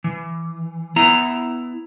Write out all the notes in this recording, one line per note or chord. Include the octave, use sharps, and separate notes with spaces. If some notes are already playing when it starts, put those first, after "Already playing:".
E3
B3 E4 A#5